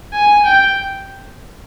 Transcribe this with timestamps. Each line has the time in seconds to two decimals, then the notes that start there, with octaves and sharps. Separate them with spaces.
0.13 G#5
0.46 G5